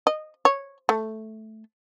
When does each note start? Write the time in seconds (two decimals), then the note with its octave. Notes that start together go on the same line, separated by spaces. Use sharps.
0.07 D#5
0.45 C#5
0.89 A3